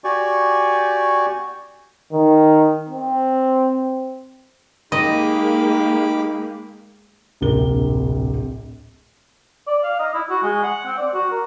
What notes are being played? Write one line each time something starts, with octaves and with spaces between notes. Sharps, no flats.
F#4 G4 D5 G#5 C#6
D#3
C4
G#3 A#3 D#4 G4 D#5 B5 D6
D1 A#1 C3 A#4 G7
D5
F5
D#5
E4
F#4
G#3
F#5
C4
D5
F#4
A#4